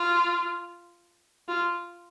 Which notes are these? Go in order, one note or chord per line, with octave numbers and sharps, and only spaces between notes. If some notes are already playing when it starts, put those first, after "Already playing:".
Already playing: F4
F4